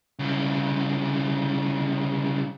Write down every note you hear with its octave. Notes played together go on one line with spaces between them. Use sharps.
C2 C#3